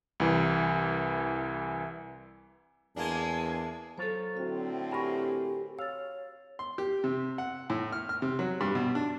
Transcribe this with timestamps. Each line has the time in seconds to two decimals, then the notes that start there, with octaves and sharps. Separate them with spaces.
0.20 C2 E3
2.96 E2 G#3 A#3 D4 G#5 A5
3.98 F#3 F4 A4 C5 C#5
4.37 A2 D3 C4 F#4
4.92 G4 A#4 G#5 B5 C#6
5.79 C#5 F5 E6 A6
6.59 C6
6.78 G4
7.04 C3
7.38 F#5
7.70 A2
7.92 F6
8.09 F6
8.22 C3
8.39 F#3
8.61 G2
8.75 B2
8.95 D4